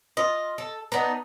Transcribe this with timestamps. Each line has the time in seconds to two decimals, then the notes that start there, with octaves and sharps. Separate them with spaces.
0.17 F4 D#5
0.58 A4
0.92 B3 D4 D#4 A#5